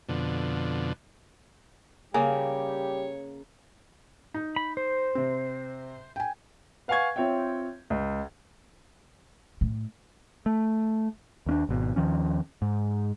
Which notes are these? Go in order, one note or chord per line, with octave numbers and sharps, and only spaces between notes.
F2 B2 D3
C#3 G3 A#3 G4 C#5 G#5
D#4
B5
C5
C3 C4
G5 G#5
B4 F5 F#5 G#5 C#6 G#6
C4 F4 C#5 E5 G5
C#2
A2
A3
D#2 C#4 D4
G#1 B2
D#2 D#3 F3 C#4
G#2